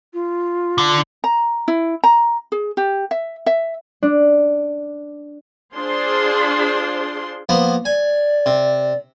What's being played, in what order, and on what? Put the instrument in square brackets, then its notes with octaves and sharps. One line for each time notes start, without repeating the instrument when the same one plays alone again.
[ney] F4
[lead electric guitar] D3
[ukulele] A#5
E4
A#5
G#4
G4
E5
E5
[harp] D4
[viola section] D4 F4 G#4 C5 C6
[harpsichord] F3 A#3 B3
[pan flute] D5 [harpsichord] G#5
[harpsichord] C3